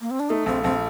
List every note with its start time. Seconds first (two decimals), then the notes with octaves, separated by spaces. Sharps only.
0.01 A#3
0.11 C4
0.20 D4
0.30 A3 D#4
0.46 A#1 C4
0.63 A#1 C4